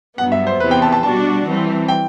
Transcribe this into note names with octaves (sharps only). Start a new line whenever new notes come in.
G2 F#3 B3 F#5
E5
C5
E2 C3 E3 B3 B4
G5
A5
A5
B2 G3 D4 F#4 A5
E3 G3 C4
G5